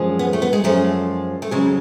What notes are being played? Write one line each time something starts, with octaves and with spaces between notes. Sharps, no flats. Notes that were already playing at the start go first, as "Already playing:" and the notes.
Already playing: F#2 F3 G#3
B3
A3
B3
G#3
F#2 F3 G#3 A3
A3
F2 C#3 F#3 G#3